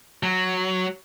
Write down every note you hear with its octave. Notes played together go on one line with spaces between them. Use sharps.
F#3